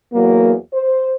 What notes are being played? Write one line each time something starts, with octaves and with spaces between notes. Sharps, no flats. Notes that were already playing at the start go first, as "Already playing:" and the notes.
E2 F#3 A#3
C5